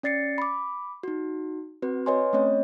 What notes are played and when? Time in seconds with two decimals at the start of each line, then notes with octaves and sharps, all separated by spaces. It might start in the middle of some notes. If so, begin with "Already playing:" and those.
0.03 C#4 D5 A6 C7 C#7
0.38 B5 D6
1.03 D#4 F#4
1.82 C4 F#4 B4
2.06 B4 C#5 D#5 G#5 C6
2.33 A3 C4 C#4 C#5 D#5